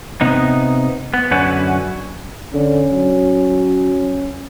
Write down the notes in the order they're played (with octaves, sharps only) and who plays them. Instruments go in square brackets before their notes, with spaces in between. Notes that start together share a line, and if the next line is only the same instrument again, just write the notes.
[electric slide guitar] C3 B3 D#4
B3
F#2 D3 C#4 F#4 B4
[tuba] D3 [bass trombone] C#4
[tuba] F#3